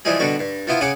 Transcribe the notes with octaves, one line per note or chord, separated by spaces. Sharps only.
E3 F3 G3 G#3 G#4
B2 D3 G3 F#4
G2
F3 B3 E4 F4
C#3 G#4 F#5 D6 D#6